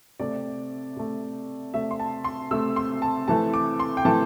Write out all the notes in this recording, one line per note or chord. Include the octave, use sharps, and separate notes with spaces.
C3 A3 D5
C3 A3
C3 A3 E5
C6
A5
C6
C3 A3 E6
C6
A5
C3 E3 A3 A5
D6
C6
G5
C3 E3 A3 A5